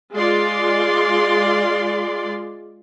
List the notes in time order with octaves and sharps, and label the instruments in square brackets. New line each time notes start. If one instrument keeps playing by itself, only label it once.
[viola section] G#3 F4 D5 C6